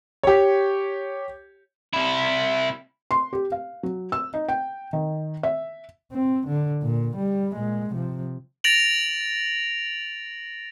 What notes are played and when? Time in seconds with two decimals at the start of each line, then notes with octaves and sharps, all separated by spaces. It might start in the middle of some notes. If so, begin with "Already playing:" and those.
0.23 G4 C#5
1.93 C3 E4
3.11 C6
3.33 G4
3.52 F5
3.83 F#3
4.12 E6
4.34 D#4
4.49 G5
4.93 D#3
5.43 E5
6.12 C4
6.48 D3
6.82 A#2
7.17 G3
7.55 A#2 G#3
7.91 C3 F3
8.64 A6 A#6 D7 F7 F#7